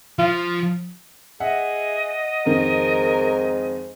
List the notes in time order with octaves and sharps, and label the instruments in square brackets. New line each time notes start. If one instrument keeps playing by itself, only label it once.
[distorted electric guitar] F3 [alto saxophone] F4
[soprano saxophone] G#4 [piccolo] D#5 [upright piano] E5 F#5
[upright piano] F2 D#3 [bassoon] G#2 [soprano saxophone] A#4